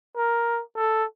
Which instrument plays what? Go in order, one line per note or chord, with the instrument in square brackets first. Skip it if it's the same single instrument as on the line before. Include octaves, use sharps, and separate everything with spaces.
[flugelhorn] A#4
A4